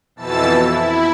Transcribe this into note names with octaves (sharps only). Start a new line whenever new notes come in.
F2 B2 E3 A5 E6 A6
E4